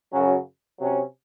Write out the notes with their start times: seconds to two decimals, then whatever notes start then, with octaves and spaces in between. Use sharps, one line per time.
0.12 F#2 C#3 F#3 C#4 F#4
0.78 C3 F#3 C#4